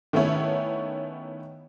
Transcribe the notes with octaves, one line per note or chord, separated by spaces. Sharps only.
D#3 A3 B3 C#4 E4 C#5